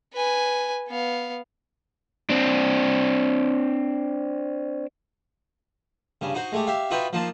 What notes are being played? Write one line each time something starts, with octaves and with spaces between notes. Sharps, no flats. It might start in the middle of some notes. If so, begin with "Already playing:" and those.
B4 G#5
B3 F5
C4 D4
G2 C#3
D#4 F#4 C5
G#3 A3 G4
G4 E5 F5
D#4 F4 F#4 B4 E5 G5
F3 A#3 D#4 A5 C6